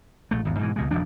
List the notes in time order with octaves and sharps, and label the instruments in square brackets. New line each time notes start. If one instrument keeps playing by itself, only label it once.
[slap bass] A#1 A3
G#1 E2
G#2 B2 E3
C#2 B2 G#3
D#1 F2 F3 D4